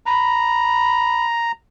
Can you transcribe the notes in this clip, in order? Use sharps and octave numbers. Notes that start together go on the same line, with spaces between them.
A#5 B5